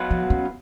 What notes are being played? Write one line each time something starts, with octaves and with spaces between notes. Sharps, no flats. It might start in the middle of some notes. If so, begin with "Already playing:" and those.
Already playing: B2 F#3 B3 F4 B4
F3
C#4